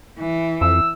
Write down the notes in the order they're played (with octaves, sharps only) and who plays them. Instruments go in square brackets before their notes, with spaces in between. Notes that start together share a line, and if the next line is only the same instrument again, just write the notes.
[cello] E3
[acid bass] F2 [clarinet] E6